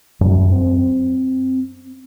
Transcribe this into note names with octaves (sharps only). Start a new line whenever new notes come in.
F#2
C4